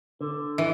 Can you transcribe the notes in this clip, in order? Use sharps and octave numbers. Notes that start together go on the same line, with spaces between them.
D3
E3